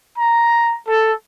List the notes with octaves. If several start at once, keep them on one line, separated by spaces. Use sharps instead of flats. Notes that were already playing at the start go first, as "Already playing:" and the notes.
A#5
A4